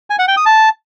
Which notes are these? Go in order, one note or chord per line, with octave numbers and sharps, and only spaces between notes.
G#5
F#5
G5
D#6
A5